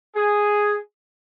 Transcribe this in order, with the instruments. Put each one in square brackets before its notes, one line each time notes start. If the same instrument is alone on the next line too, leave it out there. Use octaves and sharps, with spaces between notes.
[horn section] G#4